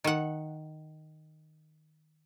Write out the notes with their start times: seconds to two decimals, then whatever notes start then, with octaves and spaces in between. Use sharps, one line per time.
0.04 D#3 F#5